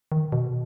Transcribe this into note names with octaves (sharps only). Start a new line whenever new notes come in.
D#3
B2